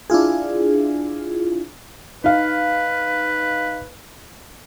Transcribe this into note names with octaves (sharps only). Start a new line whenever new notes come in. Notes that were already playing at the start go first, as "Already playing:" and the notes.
D4 E4 F4 G#4
D#4 B4 F5